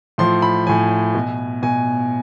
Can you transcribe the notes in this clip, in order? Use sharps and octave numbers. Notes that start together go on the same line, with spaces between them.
A2 F3 C6
B5
A2 F3 G#5
B2
B2 G#5